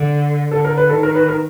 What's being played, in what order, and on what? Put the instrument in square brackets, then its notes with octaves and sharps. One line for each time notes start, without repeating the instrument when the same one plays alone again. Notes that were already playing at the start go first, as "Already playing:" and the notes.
Already playing: [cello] D3
[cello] D3 [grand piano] A4
[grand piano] A#4
B4
[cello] D#3 [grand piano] A4
[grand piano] A#4
B4
A#4